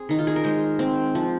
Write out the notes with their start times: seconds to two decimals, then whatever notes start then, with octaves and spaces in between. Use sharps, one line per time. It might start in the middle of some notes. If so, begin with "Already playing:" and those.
Already playing: C4 G#4
0.09 D#3 D#4
0.19 F4
0.27 G#4
0.36 A#4
0.44 G#3 C5
0.79 C4
1.15 F3